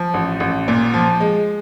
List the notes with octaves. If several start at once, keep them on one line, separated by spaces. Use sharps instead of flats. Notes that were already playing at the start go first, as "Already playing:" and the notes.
Already playing: F3
A1
A1
A#2
F3
G#3